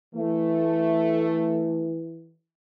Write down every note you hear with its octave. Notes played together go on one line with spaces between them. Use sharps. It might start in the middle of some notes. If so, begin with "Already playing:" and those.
E3 A3